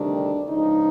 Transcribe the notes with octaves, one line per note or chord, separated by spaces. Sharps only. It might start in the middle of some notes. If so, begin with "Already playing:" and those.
Already playing: D2 C3 D#3 G3 D4
C#2 C#3 F3 D#4